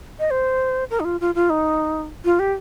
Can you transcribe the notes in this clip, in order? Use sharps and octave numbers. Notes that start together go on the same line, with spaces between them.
D#5
C5
A#4
D#4
F4
F4
F4
D#4
F4
G4